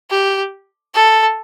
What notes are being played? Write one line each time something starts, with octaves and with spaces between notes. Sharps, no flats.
G4
A4